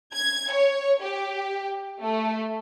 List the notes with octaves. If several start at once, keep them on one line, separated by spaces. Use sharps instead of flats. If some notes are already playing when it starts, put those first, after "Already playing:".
G#6
C#5
G4
A3